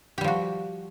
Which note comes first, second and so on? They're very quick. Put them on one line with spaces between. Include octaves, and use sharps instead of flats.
G4 G3 F3 F#4